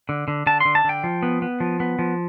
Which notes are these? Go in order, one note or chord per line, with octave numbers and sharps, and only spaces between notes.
D3
D3
D3 A5
D3 C6
A5
D3 G5
F3
B3
B3
F3
B3
F3